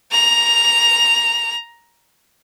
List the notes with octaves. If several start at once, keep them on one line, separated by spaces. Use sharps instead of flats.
A#5 F7